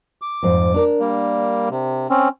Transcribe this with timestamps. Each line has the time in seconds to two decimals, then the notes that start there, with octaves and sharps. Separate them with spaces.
0.22 D6
0.43 F2 G#2 C5
0.74 D4 A#4
0.99 G3 A#3
1.70 C3
2.10 C4 C#4